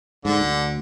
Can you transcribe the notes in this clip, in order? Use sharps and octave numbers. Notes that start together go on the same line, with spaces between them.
G#2 D3
D2